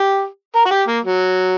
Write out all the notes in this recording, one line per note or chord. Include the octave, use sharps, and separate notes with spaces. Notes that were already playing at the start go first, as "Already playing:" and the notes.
Already playing: G4
A#4
F#4
G4
A#3
F#3